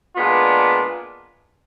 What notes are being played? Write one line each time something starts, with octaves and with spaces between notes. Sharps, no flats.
A#2 G#3 B3 D4 F4